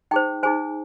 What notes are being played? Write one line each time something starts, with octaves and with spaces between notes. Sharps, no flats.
D#4 G#4 C5 G5
D#4 G#4 C5 G#5